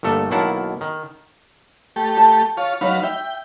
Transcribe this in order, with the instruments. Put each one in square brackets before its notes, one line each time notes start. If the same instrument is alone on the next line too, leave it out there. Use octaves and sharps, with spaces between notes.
[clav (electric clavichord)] G1 A#2 A3 A4
B1 D#3 A#3 E4 F#5 A5
D#3
[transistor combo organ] A3 G4
[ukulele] A5
[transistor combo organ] F4 C#5
[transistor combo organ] F#3 B4 F5 [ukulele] D#4 C#5
[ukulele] E5 [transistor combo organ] G5